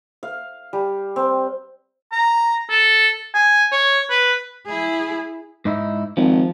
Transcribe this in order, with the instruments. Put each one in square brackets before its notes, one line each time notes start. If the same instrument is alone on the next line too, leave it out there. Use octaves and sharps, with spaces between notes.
[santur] F5
G3
C4
[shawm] A#5
A4
G#5
C#5
B4
[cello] E4 G#4
[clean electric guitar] G#2 D#4 E4
[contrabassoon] G#1 [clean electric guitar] F3